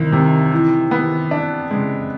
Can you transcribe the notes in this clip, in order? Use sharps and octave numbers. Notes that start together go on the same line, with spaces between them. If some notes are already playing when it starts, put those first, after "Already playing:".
Already playing: C2 D#3
C3
E3
B3
D4
C#3 G#3